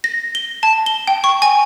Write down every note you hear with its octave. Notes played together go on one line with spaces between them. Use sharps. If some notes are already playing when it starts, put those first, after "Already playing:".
A#6
G7
A5
G7
G5
C#6
G#5